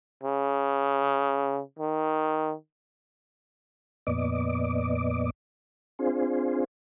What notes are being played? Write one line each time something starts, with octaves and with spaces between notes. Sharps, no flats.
C#3
D#3
F2 A#2 B3 D5 D#5 D6
C4 D4 F4 G#4 C5